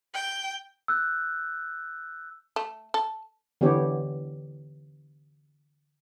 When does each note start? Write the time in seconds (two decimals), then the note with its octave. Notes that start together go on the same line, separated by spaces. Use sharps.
0.14 G5
0.88 E6 F#6 G6
2.56 A3
2.94 A4
3.61 D3 E3 B3 G4 C#5